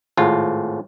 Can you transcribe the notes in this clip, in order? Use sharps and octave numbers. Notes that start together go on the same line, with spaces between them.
G#1 A2 F4